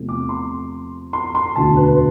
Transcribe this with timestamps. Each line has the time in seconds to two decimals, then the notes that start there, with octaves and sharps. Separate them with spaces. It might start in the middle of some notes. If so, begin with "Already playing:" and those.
Already playing: E2 C3 F3 A3
0.09 D6
0.29 C6
1.13 C6
1.35 C6
1.55 E1 D2 D3 A5
1.77 B4